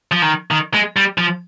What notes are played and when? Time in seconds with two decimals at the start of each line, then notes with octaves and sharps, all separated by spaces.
0.12 F3
0.22 D#3
0.51 D#3
0.74 G#3
0.97 G3
1.18 F3